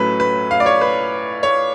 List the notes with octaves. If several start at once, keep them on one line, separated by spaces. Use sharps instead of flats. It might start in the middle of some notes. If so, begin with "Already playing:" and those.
Already playing: A2 F#3 A3 C#4 B4
B4
F5
D5
C#5
B4
C#5